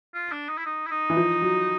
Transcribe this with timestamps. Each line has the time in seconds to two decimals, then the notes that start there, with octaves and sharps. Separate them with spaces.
0.14 F4
0.32 D4
0.49 D#4
0.58 E4
0.66 D#4
0.87 E4
0.91 D#4
1.10 E3
1.17 F3
1.42 F#3